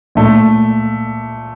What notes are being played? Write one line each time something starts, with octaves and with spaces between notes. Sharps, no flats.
A#2 A3